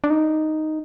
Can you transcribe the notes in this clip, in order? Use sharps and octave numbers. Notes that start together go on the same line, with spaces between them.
D4
D#4